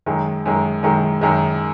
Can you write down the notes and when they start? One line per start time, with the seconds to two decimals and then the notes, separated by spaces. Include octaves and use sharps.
0.06 F#2 D#3 G#3
0.46 F#2 D#3 G#3
0.83 F#2 D#3 G#3
1.21 F#2 D#3 G#3